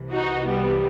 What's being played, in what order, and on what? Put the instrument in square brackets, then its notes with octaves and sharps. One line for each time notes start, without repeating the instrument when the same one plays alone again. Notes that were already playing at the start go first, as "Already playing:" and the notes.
Already playing: [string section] C2 C3 E3
D#4 F#4
G3 B3